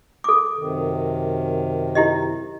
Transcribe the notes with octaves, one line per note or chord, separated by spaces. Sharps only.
A4 D6
F#2 C3 D#3
E4 G4 D#5